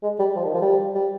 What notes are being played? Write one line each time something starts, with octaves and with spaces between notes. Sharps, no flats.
G#3
G3
F3
D#3
F3
G3
G3